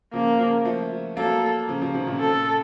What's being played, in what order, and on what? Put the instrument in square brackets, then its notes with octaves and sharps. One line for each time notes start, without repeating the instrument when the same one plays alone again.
[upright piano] C#3 F3 [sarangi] A#3
[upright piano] C#3 F3
F3 A3
[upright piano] F#3 A#3 [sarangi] A4
[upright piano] C#3 F3
C#3 F3
C3 D#3
A#2 C#3
[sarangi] A4